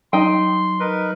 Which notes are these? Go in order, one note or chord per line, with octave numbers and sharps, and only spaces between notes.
F#3 D#4 G5 C6
D#4 A#4 B4